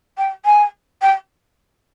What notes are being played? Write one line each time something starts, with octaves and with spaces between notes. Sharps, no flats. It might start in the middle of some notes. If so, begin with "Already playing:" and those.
G5
G#5
G5